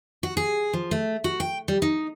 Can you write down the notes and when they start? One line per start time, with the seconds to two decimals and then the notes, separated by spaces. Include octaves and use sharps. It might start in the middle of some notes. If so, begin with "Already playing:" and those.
0.23 F#4
0.37 G#4
0.73 F3
0.91 A3
1.24 F#4
1.40 G5
1.68 G3
1.82 D#4